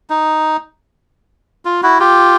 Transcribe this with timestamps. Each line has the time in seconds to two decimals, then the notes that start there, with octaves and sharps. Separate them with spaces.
0.10 D#4
1.65 F4
1.83 E4 F#4
2.00 F4 G4